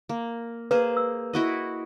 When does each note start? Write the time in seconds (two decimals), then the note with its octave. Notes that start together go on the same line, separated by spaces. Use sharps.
0.09 A#3
0.71 A#3 G#4 B4 C5
0.97 E6
1.33 E4 F#4 D#5